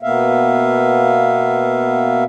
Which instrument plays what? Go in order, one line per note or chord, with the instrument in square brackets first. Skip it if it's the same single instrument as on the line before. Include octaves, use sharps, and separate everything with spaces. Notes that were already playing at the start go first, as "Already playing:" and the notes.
[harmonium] B2 A#3 B3 E5 F5